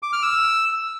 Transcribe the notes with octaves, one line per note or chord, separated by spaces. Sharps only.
D6
F6
E6